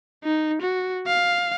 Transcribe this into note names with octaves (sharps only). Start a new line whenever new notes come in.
D#4
F#4
F5